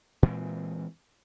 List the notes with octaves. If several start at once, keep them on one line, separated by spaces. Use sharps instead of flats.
A#2 E3 G#3 C4